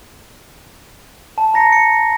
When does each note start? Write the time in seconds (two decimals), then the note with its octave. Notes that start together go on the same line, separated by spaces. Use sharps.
1.38 A5
1.54 A#5 A#6 C#7
1.72 C#7